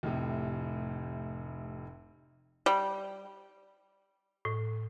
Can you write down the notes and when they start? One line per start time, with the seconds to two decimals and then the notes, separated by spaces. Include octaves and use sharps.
0.03 F1 A2 C3
2.66 G3
4.45 A2